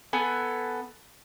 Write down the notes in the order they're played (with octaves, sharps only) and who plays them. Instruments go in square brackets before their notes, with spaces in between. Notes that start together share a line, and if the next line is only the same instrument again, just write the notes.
[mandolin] B3 A4 G#5